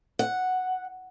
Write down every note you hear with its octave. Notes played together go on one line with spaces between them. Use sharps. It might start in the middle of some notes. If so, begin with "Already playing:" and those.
F#5